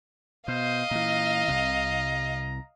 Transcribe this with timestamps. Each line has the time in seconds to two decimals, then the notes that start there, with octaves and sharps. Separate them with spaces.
0.48 B2 C5 D#5 F5
0.91 A#2 E3 A#5
1.48 C2 C3